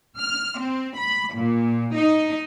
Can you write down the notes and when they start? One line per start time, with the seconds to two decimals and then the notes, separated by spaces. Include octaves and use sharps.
0.18 F6
0.60 C4
0.98 B5
1.34 A#2
1.95 D#4